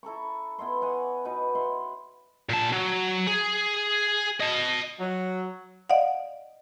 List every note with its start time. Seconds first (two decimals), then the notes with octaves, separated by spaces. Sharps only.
0.03 E4 A4 A#5 C#6
0.58 B3 E4 D#5 C6
0.81 C#5 D#5 F#5 G#5
1.25 B2 D#4 B4
1.55 E4 F#5 C6
2.49 A#2 A5
2.73 F#3
3.27 G#4
4.40 D#5 A5
5.00 F#3
5.90 D5 D#5 F5 F#5